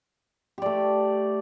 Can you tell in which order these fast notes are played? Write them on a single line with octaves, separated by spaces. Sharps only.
G4 D5 A3